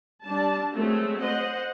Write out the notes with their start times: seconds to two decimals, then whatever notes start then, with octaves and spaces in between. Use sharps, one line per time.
0.25 G3 D4 A5
0.76 F#3 G#3 A3 C4
1.22 C5 D#5 F#5